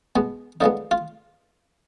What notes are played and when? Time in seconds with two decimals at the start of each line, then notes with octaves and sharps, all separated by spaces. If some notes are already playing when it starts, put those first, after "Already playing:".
0.16 B2 G#3 B3
0.61 D3 F3 G#3 B3 D#4
0.91 F4